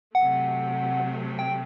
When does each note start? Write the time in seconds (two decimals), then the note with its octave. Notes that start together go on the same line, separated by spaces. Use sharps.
0.15 C3 F#3 A3 F#5
1.39 G5